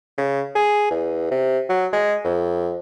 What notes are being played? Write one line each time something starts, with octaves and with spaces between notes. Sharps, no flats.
C#3
G#4
E2
C3
F#3
G#3
F2